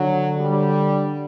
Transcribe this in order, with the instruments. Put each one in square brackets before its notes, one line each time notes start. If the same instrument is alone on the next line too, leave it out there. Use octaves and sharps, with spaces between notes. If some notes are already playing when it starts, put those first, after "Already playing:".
Already playing: [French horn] D3 [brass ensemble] F#3
[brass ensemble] G3